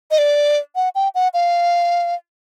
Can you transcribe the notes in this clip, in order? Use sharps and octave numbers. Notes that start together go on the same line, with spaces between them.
D#5
D5
F#5
G5
F#5
F5